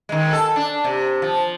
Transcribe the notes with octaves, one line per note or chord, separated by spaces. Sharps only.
D#3 G#3
A4
D4
C3
F3